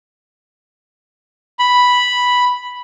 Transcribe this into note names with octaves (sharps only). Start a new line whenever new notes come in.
B5